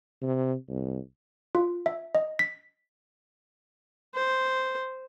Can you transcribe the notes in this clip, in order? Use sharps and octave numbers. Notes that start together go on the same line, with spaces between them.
C3
C2
F4
E5
D#5
B6
C5